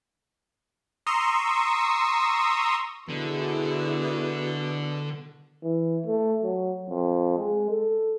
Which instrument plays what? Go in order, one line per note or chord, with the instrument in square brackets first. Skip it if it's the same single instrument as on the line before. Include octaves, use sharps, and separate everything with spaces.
[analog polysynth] A#5 C6 C#6 D#6 E6
[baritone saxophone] B2 [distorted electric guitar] D3 [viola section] E4 F#4 G#4
[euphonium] E3
A3
F#3
F2
G#3
A4